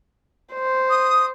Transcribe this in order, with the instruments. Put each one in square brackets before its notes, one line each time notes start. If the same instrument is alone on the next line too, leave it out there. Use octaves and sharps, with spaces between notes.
[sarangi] C5
[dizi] D#6